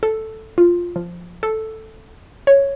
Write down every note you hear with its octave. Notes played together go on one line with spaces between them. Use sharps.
A4
F4
F3
A4
C#5